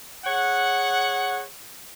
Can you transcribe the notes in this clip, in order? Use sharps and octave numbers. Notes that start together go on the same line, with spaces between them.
G#4 C#5 F#5